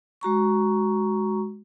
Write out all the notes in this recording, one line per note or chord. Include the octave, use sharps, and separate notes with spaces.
G#3 F#4 A#5 C#6